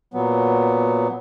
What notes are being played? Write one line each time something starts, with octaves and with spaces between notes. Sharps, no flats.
A#2 F#3 B3